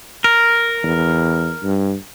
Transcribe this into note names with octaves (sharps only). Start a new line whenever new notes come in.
A#4
E2
G2